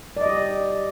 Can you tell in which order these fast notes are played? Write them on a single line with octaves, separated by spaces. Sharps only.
D5 D#5 G4